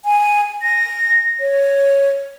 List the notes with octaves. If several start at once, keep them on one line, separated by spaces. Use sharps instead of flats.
G#5
A#6
C#5